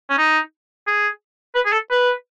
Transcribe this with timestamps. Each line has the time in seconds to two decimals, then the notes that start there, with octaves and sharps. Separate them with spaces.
0.10 C#4
0.18 D#4
0.87 G#4
1.55 B4
1.66 G#4
1.73 A4
1.91 B4